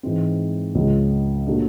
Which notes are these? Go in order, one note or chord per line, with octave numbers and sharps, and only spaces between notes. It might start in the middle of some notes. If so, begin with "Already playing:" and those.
G#2 E3 G#3 C4
C#2 C#3 F3 G#3 C#4
A#2 F#3 A3 D4